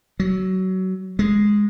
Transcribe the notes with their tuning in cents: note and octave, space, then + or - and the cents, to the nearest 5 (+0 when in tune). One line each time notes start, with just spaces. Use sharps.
F#3 +20
G#3 -5